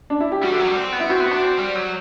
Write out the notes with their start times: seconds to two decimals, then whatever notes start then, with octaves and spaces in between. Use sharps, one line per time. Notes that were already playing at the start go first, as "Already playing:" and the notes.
0.10 D4
0.20 E4
0.32 G4
0.43 G3 F#4
0.51 D3
0.59 F#3
0.68 G3
0.76 C4
0.93 B3
1.00 E4
1.10 C4 F#4
1.21 B3
1.26 F#4
1.31 D4
1.42 C4
1.59 G3
1.75 F#3